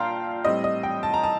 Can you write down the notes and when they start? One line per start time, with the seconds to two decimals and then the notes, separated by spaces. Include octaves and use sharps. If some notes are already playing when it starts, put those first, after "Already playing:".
Already playing: A#2 D4 F5 G5 A5 A#5 C6
0.45 A2 G3 C4 D#5
0.64 D#5
0.83 G5
1.03 A5
1.14 A#5
1.24 A5